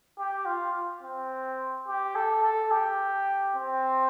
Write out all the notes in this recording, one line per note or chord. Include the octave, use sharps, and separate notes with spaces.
G4
F4
C4
G4
A4
A4
G4
C4